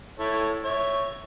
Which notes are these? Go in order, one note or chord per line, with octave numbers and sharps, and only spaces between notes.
E4 A4 C#5
C#5 E5